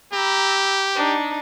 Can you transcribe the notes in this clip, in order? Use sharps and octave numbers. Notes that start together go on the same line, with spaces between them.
G4 A#5 B5 E6
D4 D#4